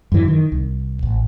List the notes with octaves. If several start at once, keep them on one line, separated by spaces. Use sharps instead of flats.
F#2 E3
D#3
C2
A1